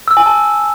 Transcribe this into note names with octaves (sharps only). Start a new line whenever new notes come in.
E6
G#5
A5